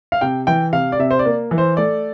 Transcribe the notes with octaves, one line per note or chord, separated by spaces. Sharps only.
F5
C3 G5
E3 G5
C3 F5
D5
C3 E5
C5
D5
A#3
E3
C5
A3 D5